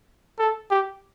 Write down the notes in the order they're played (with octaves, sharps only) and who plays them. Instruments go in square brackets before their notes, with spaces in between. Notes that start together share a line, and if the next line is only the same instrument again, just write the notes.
[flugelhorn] A4
G4